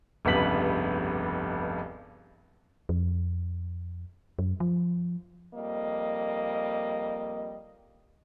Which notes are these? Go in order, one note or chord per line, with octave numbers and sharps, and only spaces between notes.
F1 C#2 G2 B3 B6 F#7
F2
F#2
F3
F2 G3 A#3 D#5